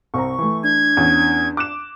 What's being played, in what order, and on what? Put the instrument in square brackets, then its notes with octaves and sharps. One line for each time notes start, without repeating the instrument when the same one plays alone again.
[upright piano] C2 C4 A#5 [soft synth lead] C#6
[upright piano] E3 A3
[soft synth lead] D4 [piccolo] G#6
[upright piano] E2 C#4
D6 F#6 E7